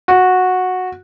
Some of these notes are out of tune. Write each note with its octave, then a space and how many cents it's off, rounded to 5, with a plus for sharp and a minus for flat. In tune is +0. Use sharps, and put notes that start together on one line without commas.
F#4 -10